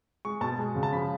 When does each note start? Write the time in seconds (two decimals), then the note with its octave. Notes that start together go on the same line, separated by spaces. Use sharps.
0.25 G#3 C#6
0.41 B2 A5
0.58 G#3
0.75 C#3
0.83 A5
0.92 F3 B5